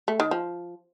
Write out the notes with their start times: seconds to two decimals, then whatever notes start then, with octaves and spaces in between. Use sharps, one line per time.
0.08 A3
0.20 D#3
0.31 F3